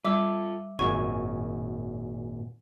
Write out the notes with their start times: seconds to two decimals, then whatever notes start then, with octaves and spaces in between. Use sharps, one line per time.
0.05 G3 F4 A4 E5 D6 E6
0.79 G#1 F#2 A#2 G#5 C#6